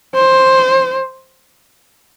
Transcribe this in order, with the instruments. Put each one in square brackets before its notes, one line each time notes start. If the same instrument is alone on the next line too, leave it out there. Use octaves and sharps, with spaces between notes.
[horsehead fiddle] C5